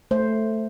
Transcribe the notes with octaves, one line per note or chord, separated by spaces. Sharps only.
A3 C5